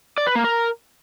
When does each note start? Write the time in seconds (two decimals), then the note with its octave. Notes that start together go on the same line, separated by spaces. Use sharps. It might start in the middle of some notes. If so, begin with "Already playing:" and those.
0.18 D5
0.27 B4
0.35 A#3
0.44 A#4